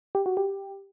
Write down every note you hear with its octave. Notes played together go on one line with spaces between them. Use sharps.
G4
F#4
G4